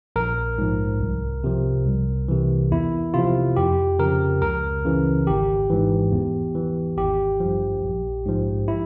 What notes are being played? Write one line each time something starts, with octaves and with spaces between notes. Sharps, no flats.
A#1 A#4
G#2 F3
C2
C3 F3
C2
C3 E3
E2 E4
C3 F3 F4
F2 G4
C#3 F3 A#4
C#2 A#4
C#3 E3
G#1 G4
G#2 E3
E2
E3
G#1 G4
G2 F3
A#1
G#2 F3
E4